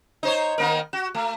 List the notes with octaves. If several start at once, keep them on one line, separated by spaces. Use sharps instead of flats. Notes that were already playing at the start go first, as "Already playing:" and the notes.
D#4 C5 C#5
D#3 A#3 A#4
F#4
A3